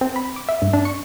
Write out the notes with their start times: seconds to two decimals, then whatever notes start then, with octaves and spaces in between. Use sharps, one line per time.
0.01 C4
0.16 B5
0.36 D6
0.49 E5
0.62 G2
0.73 D4
0.85 C#6